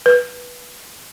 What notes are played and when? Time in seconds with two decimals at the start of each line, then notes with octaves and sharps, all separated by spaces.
0.06 B4